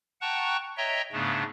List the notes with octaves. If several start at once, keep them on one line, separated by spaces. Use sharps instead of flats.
F#5 G5 A5 A#5 C#6 F#6
C#5 D#5 E5 G5 A#5
G#2 C#3 A3 B3 D4